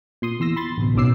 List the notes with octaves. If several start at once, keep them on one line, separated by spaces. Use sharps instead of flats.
A#2 C6 D#6
E2 C6 E6 A#6
B5 C6 A6
A1 D2 B2
B1 F#2 F#3 D6 E6 C7